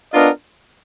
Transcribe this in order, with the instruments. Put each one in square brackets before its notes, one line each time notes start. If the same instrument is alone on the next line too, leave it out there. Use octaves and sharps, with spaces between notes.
[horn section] B3 D4 F4 A#4 D#5